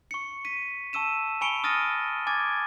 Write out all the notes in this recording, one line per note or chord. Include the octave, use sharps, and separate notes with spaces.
C#6 C#7
B6 D#7
A5 C#6 E6 D#7 E7
G#5 B5 C#6 C#7 D7 G7
D#6 F6 A6 A#6 D#7
G#5 D6 G#6 A6